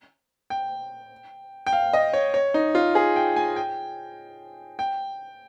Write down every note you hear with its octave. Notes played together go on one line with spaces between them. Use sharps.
G5
G5
F5
D#5
C#5
C#5
D#4
F4
G#4
G5
G#5
G5
G5